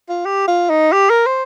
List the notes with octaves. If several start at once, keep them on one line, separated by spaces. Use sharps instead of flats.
F4
G4
F4
D#4
G4
A#4
C5